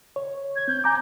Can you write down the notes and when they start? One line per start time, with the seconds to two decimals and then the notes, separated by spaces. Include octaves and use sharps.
0.16 C#5
0.56 G#6
0.68 C4 G6
0.84 G#5 A#5 D6 G6